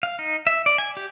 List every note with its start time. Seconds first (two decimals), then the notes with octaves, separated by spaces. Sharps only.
0.03 F5
0.19 D#4
0.47 E5
0.66 D5
0.78 G#5
0.97 G4